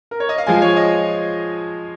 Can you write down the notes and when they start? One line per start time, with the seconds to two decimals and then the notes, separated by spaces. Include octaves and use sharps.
0.11 A#4
0.20 C#5
0.29 D#5
0.38 F5
0.47 F3 G#3 F4 G#5
0.62 C#5
0.76 D#5